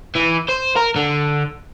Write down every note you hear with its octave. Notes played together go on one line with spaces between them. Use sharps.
E3
C5
A#4
D3